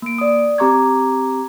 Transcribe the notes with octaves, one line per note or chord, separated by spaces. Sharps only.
A#3 D7
D5 D#6
C4 G4 A#5 C#6 D6 G#6